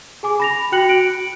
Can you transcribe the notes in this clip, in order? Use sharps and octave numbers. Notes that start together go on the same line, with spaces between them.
G#4 G#5 D6
B5 A#6 F7
F#4 G5 F#6 C#7 F#7
D7